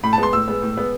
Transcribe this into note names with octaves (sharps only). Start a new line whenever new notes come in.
A2 B5
A5
G#3 B3 C6
A2 E6
G#3 B3
A2
G#3 B3